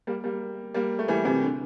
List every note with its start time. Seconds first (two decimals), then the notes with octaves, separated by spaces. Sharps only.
0.07 G3 A#3
0.24 G3 A#3
0.74 G3 A#3
0.99 A3
1.08 E3 G3
1.25 C3 E3
1.42 D3